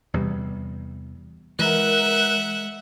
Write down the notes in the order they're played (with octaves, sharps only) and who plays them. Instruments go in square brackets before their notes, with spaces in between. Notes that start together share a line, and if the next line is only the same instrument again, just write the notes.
[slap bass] E2 C3 G3
[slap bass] E3 [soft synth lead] G#3 [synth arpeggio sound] A#4 F#6 [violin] E5 F#5